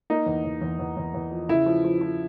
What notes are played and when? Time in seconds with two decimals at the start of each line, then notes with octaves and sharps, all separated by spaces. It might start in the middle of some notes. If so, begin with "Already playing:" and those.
0.10 A#3 D#4
0.26 E2
0.44 E2
0.61 E2
0.79 E2
0.97 E2
1.14 E2
1.31 F3
1.49 C#3 E4
1.66 F3
1.84 F3
2.01 F3